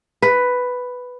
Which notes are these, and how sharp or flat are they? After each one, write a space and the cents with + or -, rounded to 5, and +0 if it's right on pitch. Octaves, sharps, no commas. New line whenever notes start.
B4 +5